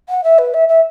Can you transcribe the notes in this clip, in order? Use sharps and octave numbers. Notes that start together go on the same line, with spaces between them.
F#5
E5
B4
E5
E5